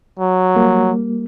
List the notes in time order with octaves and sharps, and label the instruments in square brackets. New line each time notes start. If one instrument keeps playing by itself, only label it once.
[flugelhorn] F#3
[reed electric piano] G3 A#3